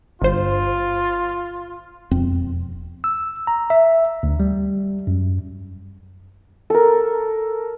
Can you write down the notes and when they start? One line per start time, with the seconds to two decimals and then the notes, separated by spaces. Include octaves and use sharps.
0.22 G1 F4 C5
2.11 E1 F2 C4
3.04 E6
3.47 A#5
3.70 E5
4.23 D2
4.40 G3
5.07 F#2
6.70 A4 A#4